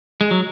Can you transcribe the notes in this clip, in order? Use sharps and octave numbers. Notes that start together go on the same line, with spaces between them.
G#3
F#3